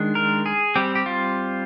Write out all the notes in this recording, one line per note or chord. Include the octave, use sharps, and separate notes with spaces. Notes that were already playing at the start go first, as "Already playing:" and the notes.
Already playing: D#3 G#3 D4
A#4
G#4
G3 C4 G4
G4
F4